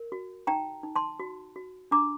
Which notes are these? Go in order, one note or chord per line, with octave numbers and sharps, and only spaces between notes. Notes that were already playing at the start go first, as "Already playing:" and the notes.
Already playing: A#4
F#4
D#4 G5 A#5
D#4
A5 C6
F#4
F#4
D4 A#5 D6